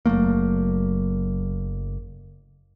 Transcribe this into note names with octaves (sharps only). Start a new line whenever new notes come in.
F#1 F#3 A3 A#3